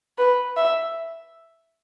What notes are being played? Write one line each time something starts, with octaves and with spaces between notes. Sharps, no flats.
B4
E5